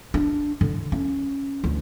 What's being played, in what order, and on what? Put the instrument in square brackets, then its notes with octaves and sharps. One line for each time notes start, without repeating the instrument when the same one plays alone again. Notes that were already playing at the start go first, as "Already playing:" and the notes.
[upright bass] D4
D3
C#4
D2